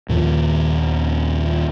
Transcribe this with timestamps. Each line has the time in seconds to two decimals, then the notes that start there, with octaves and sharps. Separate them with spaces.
0.09 D#2 A#2 D#3 F3